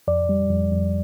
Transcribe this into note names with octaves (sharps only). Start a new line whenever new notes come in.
F2 D5
G3
F2
F2